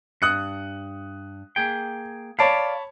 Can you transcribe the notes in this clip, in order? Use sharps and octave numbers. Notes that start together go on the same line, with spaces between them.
G2 D#6 F#6 C#7
A#3 G#4 G5
C#5 D5 F5 A5 B5